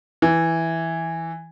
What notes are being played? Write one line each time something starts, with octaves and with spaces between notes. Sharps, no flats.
E3